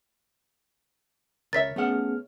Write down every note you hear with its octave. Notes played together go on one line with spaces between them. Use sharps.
C#2 A#4 C#5 E5 A6 B6
A3 B3 C#4 G#4 F#5 F6